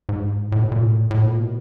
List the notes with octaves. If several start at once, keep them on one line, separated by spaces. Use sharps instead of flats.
G#2
A2
B2
A#2
A2
A2
A#2
B2